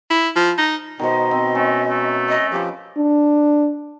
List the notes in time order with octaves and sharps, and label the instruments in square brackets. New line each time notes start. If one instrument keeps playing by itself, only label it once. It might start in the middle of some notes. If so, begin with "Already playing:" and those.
[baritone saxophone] E4
F3
D#4
[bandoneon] B2 [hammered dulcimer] D#3 A#4 C5 [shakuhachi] D#5
[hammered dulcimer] C4
[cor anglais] A3 [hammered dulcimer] C#4
[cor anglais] A3
[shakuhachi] D#5
[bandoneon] F3 [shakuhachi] G4 [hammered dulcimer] B4 D6
[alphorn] D4